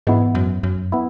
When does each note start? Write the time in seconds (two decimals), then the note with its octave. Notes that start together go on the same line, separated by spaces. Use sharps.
0.07 G#2 E3 G#3 B3 E4
0.35 F#2
0.63 F#2
0.92 B3 E4